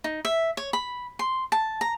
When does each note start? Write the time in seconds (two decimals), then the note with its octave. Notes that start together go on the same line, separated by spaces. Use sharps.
0.04 D#4
0.25 E5
0.57 C#5
0.73 B5
1.19 C6
1.52 A5
1.81 A#5